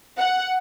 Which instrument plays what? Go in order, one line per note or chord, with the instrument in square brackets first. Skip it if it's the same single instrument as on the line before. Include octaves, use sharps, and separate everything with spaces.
[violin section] F#5